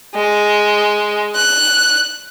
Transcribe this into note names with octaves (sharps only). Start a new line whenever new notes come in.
G#3
F#6